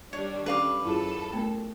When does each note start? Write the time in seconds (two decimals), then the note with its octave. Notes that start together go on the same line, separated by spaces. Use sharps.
0.13 D#3 G3 D4 C#5
0.46 C#4 A4 B4 F5 D6
0.85 F#2 E4 F4 G#4 A4
1.33 A3 B3 A#4